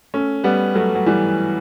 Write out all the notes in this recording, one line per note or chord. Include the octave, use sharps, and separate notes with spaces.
A3 C#4
G3 B3
F#3 A3
F#3
E3 G3